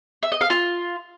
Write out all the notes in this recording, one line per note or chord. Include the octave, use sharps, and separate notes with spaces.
E5
D#5
F5
F4